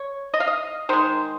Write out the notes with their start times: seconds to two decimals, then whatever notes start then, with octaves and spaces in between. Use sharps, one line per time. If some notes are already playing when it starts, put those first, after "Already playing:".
Already playing: C#5
0.34 D#5
0.40 F5
0.47 D#5
0.89 D#3 G#3 C5